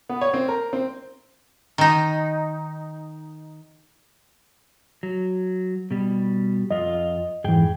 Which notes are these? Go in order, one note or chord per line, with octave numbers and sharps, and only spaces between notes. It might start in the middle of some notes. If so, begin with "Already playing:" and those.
B3
C#5
C4
A#4
C4
D#3 D#4
F#3
B2 G3
F2 F4 D#5
F2 G#2 E3 G#4 G5